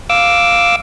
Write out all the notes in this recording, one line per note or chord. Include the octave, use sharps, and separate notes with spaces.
F5 D6 E6